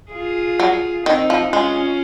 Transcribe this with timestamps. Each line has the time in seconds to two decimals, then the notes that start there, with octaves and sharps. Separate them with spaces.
0.12 F4 G#4
0.60 F#3
1.06 D#3 C4 D#4
1.30 F3
1.53 G#3 C#4 F4